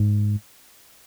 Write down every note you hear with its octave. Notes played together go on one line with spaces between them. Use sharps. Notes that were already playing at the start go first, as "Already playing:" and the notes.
Already playing: G#2